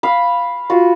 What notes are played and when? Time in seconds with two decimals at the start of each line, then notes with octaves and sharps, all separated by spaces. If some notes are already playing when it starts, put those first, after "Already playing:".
0.03 F5 B5
0.70 F4 F#4